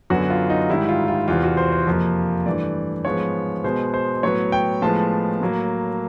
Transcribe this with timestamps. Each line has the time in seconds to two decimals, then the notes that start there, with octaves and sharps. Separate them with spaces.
0.10 F#2 D3 F#3 B3 F#4
0.30 F4
0.50 D#4
0.70 G#2 D#3 G3 E4
0.89 F4
1.08 F4
1.28 E2 C3 E3 F4
1.43 F#4
1.57 C5
1.72 C5
1.87 F2 C3 F3 A#3
2.46 G2 E3 A3 D5
3.05 G#2 F3 G#3 B3 C#5
3.64 B2 G#3 B3 C5
3.94 C5
4.23 A2 F#3 B3 C#5
4.52 G5
4.82 A2 F3 G#3 B3 A5
5.41 A2 F#3 A#3